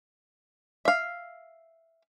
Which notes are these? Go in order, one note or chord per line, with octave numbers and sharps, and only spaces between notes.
E5 F5